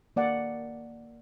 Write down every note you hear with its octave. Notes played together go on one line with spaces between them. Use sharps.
A#3 D5 F#5